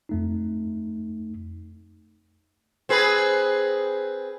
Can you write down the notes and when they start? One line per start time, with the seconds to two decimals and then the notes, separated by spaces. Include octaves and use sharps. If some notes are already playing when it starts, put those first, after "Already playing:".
0.09 F2 A3 D#4
2.89 C4 G#4 B4